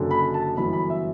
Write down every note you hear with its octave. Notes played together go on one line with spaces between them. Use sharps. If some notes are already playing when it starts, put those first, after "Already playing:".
Already playing: F#1 F#2 D3
B5
A5
G1 F#2 E3 B5
B5
E5